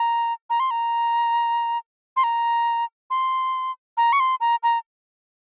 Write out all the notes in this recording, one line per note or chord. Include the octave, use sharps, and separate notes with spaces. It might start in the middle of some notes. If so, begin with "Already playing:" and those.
Already playing: A#5
A#5
C6
A#5
C6
A#5
C6
A#5
C#6
C6
A#5
A#5